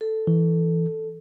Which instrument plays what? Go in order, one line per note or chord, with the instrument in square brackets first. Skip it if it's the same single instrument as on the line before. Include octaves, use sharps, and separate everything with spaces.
[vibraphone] A4
[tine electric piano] E3